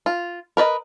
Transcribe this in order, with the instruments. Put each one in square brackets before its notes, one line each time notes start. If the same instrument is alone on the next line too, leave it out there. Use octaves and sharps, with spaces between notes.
[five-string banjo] F4
A#4 B4 D5 D#5